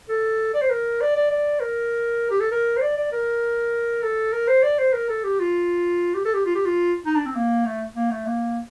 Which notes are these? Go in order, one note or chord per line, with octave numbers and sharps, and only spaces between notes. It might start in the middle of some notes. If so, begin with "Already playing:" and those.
A4
D5
C5
A#4
D5
D5
D5
A#4
G4
A4
A#4
C5
D5
D5
A#4
A4
A#4
C5
D5
C5
A#4
A4
G4
F4
G4
A4
G4
F4
G4
F4
D#4
D4
C4
A#3
A3
A#3
A3
A#3